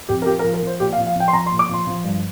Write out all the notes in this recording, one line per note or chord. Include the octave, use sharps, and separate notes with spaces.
F2 G4
A#4
F3 G4
A#4
F3
A#4
F3 C5
A#2 G4
F5
F3
F5
F3 G5
C6
F3 A#5
C6
A#2
D6
F3 C6
F3
G2